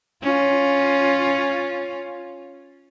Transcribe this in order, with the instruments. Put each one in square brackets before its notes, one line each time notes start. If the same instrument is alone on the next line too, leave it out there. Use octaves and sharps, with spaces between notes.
[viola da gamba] C#4 F4